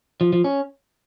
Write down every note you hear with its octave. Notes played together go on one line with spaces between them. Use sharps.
F3
F3
C#4